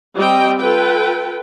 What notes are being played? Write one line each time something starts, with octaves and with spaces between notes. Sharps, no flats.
G3 C4 D#5 G5
F4 A4 B4 G5